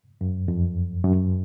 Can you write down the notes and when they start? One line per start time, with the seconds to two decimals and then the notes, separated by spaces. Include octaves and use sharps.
0.21 F#2
0.48 F2
1.04 F#2